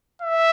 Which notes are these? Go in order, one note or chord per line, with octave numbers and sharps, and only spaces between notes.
E5